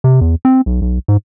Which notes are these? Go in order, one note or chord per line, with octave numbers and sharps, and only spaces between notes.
C3
E2
C4
B1
B1
G#2